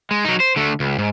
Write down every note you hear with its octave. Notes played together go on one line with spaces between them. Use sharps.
G#3
F#3 D#4
C5
D3 A3
C#2
G#2